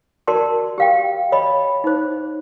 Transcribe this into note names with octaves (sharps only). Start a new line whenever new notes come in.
F#4 A#4 D5 A5 C6
G4 F5 G5
C#5 D#5 B5
D#4 C5